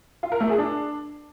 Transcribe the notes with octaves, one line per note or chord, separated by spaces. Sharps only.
F4
A#4
A3
G#4
D4